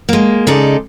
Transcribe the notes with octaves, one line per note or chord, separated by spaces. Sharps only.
G#3 A#3
C#3 G#3 D#4 A4 D5